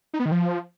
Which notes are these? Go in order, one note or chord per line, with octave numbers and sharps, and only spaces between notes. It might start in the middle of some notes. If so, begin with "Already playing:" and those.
D#4
B3
D#3
F3